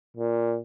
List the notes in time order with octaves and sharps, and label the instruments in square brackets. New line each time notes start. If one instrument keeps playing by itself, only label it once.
[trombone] A#2